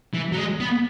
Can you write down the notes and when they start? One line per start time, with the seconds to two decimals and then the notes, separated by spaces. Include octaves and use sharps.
0.14 E3
0.32 F#3
0.37 G#3
0.60 B3